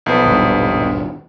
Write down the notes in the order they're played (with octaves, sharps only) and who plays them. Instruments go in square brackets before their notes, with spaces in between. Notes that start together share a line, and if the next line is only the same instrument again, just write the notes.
[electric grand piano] B1 F3 B3
[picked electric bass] D#1 G#1 G2